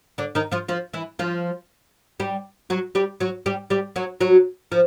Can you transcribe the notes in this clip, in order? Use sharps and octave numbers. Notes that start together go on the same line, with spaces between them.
D3 D4
D#3 D#4
F3 F4
F3 F4
E3 E4
F3 F4
G3 G4
F#3 F#4
G3 G4
F#3 F#4
G3 G4
G3 G4
F#3 F#4
F#3 F#4
F3